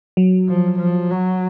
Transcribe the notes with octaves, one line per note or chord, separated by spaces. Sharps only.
F#3
F3
F3
F#3